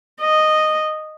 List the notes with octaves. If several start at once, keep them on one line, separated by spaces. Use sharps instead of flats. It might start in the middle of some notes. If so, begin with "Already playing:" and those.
D#5